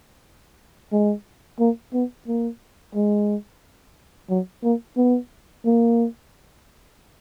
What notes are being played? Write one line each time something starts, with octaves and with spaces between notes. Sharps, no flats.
G#3
A#3
B3
A#3
G#3
F#3
A#3
B3
A#3